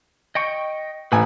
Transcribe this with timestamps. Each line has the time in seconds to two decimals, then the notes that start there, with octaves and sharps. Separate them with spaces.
0.35 D#5 G5 C#6
1.12 A1 B4 G#5